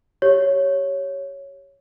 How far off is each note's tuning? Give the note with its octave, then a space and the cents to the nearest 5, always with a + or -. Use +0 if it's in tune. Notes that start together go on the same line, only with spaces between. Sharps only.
G4 +0 C#5 +0